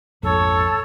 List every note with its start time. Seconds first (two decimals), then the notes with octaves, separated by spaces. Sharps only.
0.23 A#1 F2 G#2 A4 C#5